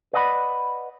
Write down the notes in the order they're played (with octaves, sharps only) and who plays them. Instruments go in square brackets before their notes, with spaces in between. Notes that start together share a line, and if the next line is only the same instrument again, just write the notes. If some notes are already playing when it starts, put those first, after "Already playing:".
[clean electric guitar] B4 D5 D#5 F#5 A5 B5